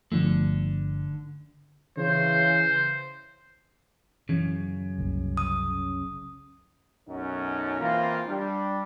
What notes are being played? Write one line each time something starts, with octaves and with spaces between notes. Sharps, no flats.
G1 D3 F3 A3
C#3 E3 C5
F#2 C#3 E3
F#1 C2
D#6
B1 F#2 C#4 D#4
E3 A#3 C4 F4
G3 D4